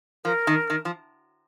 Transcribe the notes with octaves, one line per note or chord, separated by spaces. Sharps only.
F3 A#4
D#3
D#3
F3